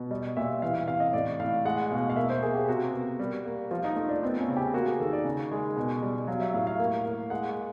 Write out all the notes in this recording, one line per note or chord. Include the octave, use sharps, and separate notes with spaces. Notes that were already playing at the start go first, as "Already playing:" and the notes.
Already playing: B2 B3
G3 D#5
A#2 E5
E3 F5
F5
C3 F5
D#5
A2 D5
A2 F5
G#3 F#5
B2 F5
F5
A#3 E5
C5
A#3 G#4
G4
C3 F#4
B3
G3
A#3
F3 F4
D#4
A3 D#4
D4
B3 C4
C#4
C#3
G4
A#3 F#4
G#4
D#3 A4
D5
C#3
G#3
B2
G3
F#3 F5
E5
A2 F5
F5
A#3
A#3
G#3 F#5